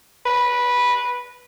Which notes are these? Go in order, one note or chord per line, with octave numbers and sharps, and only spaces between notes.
B4